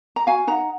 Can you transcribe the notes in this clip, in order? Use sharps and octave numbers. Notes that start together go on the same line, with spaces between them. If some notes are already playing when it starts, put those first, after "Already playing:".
A#5
F#4 F5 G#5
D#4 F#5 A#5